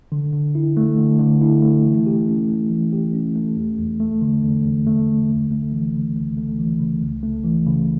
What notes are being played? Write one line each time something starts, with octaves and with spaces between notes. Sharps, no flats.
D3
D3
E4
A3
D3
D3
E4
A3
E3
G4
C#4
A3
E3
G4
C#4
A3
E2
E2
A3
D3
E2
E2
A3
D3
C#2
A3
E3
C#3
C#2
A3
E3
C#3
C#2
A3
E3
C#3